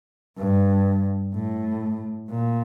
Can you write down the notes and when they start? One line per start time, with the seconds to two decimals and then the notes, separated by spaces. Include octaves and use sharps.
0.39 G2
1.34 A2
2.31 A#2